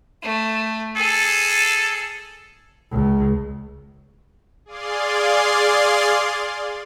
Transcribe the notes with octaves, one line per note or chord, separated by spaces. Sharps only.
A3
G#4 A4 G#5
C#2
G#4 D5 F5 C6